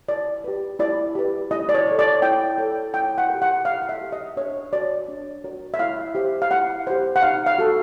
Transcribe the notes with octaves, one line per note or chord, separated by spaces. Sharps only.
E4 D5
G4 B4
E4 D5
G4 B4
E4 D#5
D5
C#5
A4 C#5
D5
E4 G5
A4 C#5
E4 G5
F#5
G4 A#4
F#5
E4 F5
F5
E5
G4 A#4
D#5
D4 C#5
F#4 A#4 C#5 D5
D4
F#4 A#4 C#5
E5
E4 F5
G4 C5
F5
E4 F#5
G4 C5
F#5
D#4 F5
F5
F#4 A4